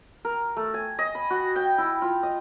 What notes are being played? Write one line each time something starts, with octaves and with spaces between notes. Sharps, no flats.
A#4
A3
G#5
D#5
B5
F#4
G5
E4
F4
D#5